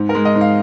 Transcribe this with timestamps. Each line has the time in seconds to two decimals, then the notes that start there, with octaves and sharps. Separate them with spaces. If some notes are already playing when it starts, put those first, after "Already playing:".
Already playing: G#2
0.09 A#4
0.15 G#3
0.25 D#5
0.35 G#2
0.41 F5